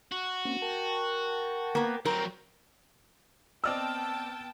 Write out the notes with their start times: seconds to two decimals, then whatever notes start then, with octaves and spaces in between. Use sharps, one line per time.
0.12 F#4
0.45 A#3 C4 C#4
0.62 A#4 G5 A5
1.75 A#3 B3
2.05 F#3 C4 A#4 G6
3.64 B3 C4 D5 D#5 G5 A5 E6 F6